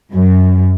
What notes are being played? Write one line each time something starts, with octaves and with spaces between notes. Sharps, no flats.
F#2